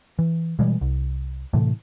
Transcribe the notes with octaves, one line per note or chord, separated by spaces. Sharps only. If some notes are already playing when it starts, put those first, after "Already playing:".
E3
B2 E3 G3 G#3
C2
A2 C3 E3 A3